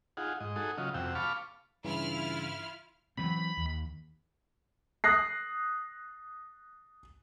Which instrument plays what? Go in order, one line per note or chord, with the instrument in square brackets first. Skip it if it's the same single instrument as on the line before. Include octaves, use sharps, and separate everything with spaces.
[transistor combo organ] D#4 F4 G#4 F#5
G#2 D#5
D#4 F#4 G#4 A4 D#6
C#3 F#3 F4 D#5
F2 C3 F#4 G5 E6
F5 A5 B5 C#6 D6 F6
[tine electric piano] G2 C#3 E3 [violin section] E4 F4 F6
[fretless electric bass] E3 F#3 C4 [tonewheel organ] B5
[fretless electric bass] D#2
[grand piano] D#6 F#6 A#6 C7